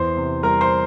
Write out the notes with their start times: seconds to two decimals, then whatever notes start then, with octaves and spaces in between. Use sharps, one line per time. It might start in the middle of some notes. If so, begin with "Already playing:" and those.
Already playing: E2 C5 C6
0.17 C3
0.43 G3 A#4 A#5
0.61 C5 C6